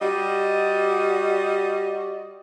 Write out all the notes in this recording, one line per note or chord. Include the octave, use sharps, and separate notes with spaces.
G3 F#4 D5 D#5